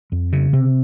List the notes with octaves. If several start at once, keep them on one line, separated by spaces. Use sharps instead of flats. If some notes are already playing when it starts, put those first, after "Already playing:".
F2
C#3
C3